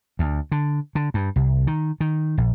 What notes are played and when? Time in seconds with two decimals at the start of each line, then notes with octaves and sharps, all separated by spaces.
0.19 D2
0.52 D3
0.95 D3
1.14 G2
1.36 C2
1.67 D#3
2.00 D#3
2.38 A#1